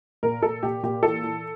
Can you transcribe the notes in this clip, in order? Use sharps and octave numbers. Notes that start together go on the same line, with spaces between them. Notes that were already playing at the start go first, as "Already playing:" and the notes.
A#2 A#4
A#2 A4
A#2 G4
A#2 G4
E3 A4
E3